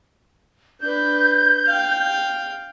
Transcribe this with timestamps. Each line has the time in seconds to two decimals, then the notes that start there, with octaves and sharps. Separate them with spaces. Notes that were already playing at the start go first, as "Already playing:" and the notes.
0.81 D4 B4 G6
1.67 F5 G5